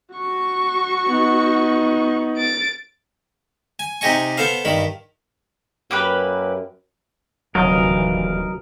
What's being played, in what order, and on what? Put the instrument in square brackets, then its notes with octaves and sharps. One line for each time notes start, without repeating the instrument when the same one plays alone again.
[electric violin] F#4 C#6
[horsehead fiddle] B3 D#4
[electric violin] A6 D7
[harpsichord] G#5
C3 D#4 G4 D#5 G#5 C#6
B3 A4 C5 F5
G2 D#3 B5
[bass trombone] F#2 [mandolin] A#3 G4 B4
[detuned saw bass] D#1 [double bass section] D2 C3 E3 [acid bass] F#3 [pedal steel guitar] A#4 D#5 F5